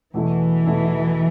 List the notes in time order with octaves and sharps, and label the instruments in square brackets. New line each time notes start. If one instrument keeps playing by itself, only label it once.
[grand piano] E2 B2 A3 E4 [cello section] E3
[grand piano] E2 B2 A3 E4